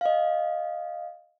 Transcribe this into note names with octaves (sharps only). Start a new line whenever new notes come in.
D#5 F5